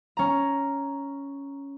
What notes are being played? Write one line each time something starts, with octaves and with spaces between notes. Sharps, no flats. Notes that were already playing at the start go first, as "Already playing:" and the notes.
C#4 A#5